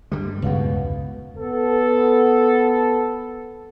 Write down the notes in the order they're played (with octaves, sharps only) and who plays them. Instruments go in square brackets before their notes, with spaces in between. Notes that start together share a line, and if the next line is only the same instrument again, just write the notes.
[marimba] G2 [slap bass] D3 G3
[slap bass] C#2 B2 [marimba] B4 F5 F#5
[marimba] E2
[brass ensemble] B3 A4